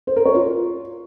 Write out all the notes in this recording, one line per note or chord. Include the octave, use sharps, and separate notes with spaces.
C5
A#4
C#5
F4